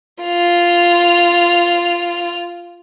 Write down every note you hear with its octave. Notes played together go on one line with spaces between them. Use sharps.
F4 F7